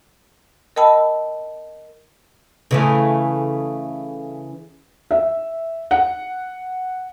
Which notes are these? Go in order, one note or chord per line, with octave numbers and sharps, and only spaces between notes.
A#4 D#5 G5 A5 B5 E6
C#3 E3 A3
E5
F#5